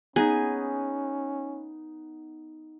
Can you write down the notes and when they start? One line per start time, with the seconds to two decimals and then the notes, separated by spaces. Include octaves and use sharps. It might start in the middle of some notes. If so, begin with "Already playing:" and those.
0.16 B3 C#4 D#4 G#4